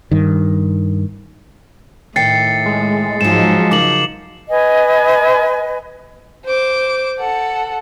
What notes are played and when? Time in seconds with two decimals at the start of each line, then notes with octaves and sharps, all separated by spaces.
0.11 G2 D#3
2.16 A2 D#3 G5 A6 C7 C#7
2.66 G#3
3.21 G#2 F3 F#3 D#4 E7
3.71 C#3 D#4 A#4 D6 F#7
4.50 B4 D#5 G#5
6.46 C5 D6
7.19 A4 F#5